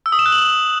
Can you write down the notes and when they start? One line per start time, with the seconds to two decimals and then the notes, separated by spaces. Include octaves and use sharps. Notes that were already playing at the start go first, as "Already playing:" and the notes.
0.06 E6
0.12 D#6
0.19 E7
0.26 F#6
0.32 F#7